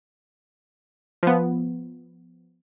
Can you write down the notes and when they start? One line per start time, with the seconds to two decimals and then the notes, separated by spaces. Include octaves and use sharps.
1.23 F3 B3